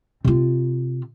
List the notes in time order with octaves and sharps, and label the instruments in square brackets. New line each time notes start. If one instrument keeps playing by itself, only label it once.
[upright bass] C3 F4